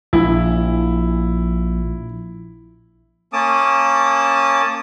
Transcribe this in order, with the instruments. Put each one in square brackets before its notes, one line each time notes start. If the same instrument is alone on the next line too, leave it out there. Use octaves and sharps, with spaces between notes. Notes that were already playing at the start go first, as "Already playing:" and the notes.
[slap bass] A#1 [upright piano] E4
[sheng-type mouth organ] A#3 C#4 A5 D6 D#6